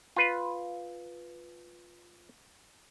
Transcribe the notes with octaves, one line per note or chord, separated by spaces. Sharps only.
F4 B4